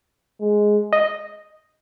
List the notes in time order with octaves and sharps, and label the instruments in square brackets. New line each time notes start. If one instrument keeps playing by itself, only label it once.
[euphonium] G#3
[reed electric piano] D#5